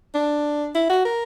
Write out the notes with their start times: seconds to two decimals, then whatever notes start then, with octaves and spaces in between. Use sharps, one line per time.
0.15 D4
0.75 E4
0.90 F#4
1.05 A#4